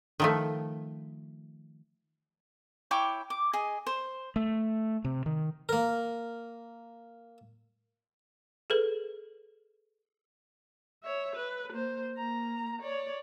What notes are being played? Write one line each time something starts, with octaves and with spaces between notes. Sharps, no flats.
D#3 F3 A3
E4 C#5 G5 D6
D6
G#4 D#5
C5
A3
C3
D#3
A#3 A#4
G#4 A4 B4
C#5 E5
B4
A#3 C5
A#3 A#5
C#5 D5